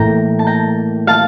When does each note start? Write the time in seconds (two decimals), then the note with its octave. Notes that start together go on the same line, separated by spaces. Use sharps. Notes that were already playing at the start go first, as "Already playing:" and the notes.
Already playing: A2 E3 A#3 G5 A#5
0.39 A5
0.47 G5 A#5
1.07 F5 A5